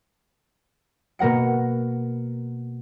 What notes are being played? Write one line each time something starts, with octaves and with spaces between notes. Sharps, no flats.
B2 A#3 A#4 F#5 C#7